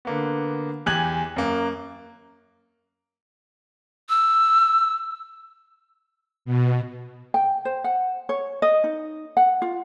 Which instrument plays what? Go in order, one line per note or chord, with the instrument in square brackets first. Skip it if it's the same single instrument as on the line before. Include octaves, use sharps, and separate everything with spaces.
[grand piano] D3 A#3 B3
E2 G4 G#5 F#6 G#6 F#7
F#2 A#3
[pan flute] E6
[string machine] B2
[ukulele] G5
C5
F#5
C#5
D#5
D#4
F#5
F4